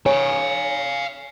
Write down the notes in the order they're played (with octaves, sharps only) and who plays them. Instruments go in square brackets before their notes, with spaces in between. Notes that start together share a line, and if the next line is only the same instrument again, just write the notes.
[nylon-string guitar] C#5 [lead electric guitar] F5 G#5